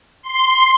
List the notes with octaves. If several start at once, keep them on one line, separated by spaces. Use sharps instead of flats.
C6